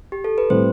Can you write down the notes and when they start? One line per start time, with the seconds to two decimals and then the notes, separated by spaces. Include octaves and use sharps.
0.12 G4
0.24 A4
0.38 B4
0.50 A2 G3 C4 C5